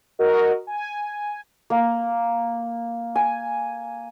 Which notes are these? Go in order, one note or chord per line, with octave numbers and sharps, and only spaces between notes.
F#4 A#4 D#5
G#5
A#3
G#5